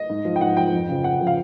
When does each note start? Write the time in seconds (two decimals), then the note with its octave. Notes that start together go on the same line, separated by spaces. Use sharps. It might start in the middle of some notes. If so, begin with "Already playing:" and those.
Already playing: D#5
0.10 G#2
0.25 F3
0.36 G5
0.41 G#2 F#5
0.57 F3 G5
0.73 F2
0.89 C#3 F3
1.04 F2 F#5
1.20 C#3 F3
1.27 F5